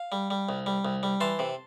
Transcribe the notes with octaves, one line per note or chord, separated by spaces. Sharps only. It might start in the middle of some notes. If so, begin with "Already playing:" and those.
Already playing: F5
G3
G3
C2
G3
C2
G3
E3 A5 C6
C3